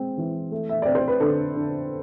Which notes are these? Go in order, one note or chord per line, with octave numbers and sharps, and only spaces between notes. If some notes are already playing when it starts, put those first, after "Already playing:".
Already playing: G#3 C4
E3
A3
E5
C4 D5
C5
B4
D3 A4
D3